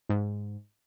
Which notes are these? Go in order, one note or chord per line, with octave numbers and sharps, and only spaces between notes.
G#2